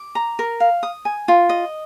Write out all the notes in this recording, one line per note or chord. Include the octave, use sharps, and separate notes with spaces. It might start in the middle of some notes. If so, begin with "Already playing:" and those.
Already playing: D6
A#5
A#4
F5
D#6
G#5
F4
D#5